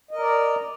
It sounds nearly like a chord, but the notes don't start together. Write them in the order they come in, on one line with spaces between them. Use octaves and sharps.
D#5 A#4 D5 A#5